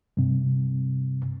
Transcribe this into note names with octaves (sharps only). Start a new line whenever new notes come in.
G2 C3